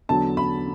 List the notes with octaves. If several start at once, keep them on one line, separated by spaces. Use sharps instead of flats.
E2 D3 F#3 A5
B5